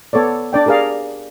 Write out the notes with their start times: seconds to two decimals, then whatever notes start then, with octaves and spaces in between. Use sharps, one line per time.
0.13 B3 A4 C#5 D5
0.53 D4 D5 G5
0.66 G4 G#4 A#4 D5 F5